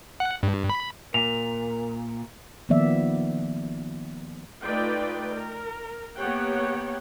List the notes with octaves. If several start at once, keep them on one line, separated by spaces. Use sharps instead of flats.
F#5
G2
B5
A#2 A#4 F7
D#3 F3 A#3 B3 D5 E5
A3 D#4 F4 B4 D5 G5
A#4
A#3 B3 G4 C#5 F#5 G5